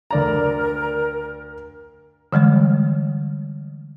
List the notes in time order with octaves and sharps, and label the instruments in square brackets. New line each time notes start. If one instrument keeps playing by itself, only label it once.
[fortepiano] D2 D5 A#5 [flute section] A#4
[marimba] D3 E3 G3 G#3